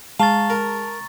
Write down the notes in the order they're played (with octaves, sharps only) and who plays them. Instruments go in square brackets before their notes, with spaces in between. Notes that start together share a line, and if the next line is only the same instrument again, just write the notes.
[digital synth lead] G#3 [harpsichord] F5 [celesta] A5 [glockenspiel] A#5 C#6 A6
[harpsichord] A#4